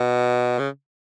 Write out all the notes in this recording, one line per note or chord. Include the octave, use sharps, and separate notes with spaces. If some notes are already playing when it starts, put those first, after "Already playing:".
Already playing: B2
C#3